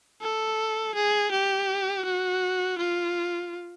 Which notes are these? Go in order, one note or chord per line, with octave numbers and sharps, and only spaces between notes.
A4
G#4
G4
F#4
F4